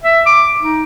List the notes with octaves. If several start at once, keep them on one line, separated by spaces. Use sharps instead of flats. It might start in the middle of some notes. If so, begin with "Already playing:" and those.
E5
D6
D#4